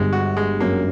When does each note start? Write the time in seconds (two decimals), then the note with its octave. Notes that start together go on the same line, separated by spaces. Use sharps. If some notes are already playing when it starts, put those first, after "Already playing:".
Already playing: G1 G2 G#3
0.13 F#4
0.37 G#3
0.60 F#2 A#3